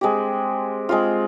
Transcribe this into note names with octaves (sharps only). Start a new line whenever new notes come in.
G#3 C4 G4
G#3 C4 F4